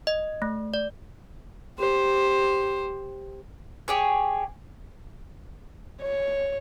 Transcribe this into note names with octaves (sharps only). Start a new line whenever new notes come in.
D#5
A3
D5
G4 C5
G4 G#4 C#5
C#5